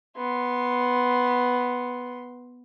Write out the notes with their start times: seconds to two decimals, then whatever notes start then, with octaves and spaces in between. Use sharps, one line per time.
0.16 B3 C6